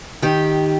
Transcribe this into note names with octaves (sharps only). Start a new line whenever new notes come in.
D#3 G4